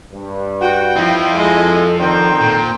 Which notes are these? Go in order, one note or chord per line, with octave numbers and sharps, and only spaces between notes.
G2
F#4 G5
F3 C4 E4 F4
G#3 A4 D#5
F2 D3 D#3 A4 C5 G5 A#5
A#2